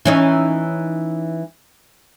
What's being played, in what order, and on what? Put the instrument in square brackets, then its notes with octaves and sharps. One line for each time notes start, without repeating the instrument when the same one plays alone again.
[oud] E3 C#4 D#4